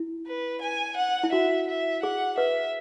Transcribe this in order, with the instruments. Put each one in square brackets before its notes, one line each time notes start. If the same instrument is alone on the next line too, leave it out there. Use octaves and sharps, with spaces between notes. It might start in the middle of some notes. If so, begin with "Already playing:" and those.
Already playing: [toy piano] E4
[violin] B4
G#5
F#5
[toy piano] E4
[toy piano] F#4 [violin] E5
[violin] E5
[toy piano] G#4 [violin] F#5
[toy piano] B4 [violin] E5